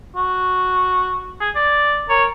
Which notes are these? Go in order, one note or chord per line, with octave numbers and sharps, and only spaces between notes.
F#4
G#4
D5
A#4 C#5